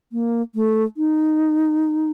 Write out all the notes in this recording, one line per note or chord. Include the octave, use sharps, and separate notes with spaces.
A#3
A3
D#4